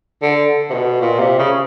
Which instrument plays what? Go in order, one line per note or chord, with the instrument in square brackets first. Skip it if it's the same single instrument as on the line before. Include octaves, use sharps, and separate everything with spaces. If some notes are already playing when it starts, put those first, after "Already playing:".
[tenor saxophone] D3
C3
B2
A#2
C3
C#3